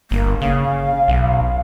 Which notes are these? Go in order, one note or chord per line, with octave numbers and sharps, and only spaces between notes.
G1 A#3
C#3 F5
B1